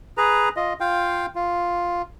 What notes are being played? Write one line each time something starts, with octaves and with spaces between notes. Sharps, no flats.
G#4 B4 A#5
F4 D#5
F4 F5 G5
F4